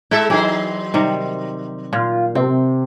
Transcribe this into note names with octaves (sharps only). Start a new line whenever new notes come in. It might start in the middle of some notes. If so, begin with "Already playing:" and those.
G#3 E4 A4 E5
E3 F#3 D#4 G#4 C5
C3 D#3 G3
A#2 F4
C3 C4